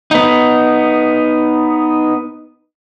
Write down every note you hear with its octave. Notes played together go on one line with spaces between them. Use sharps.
B3 D#4